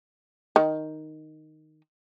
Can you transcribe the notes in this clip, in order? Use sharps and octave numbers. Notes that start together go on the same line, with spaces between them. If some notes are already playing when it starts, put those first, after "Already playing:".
D#3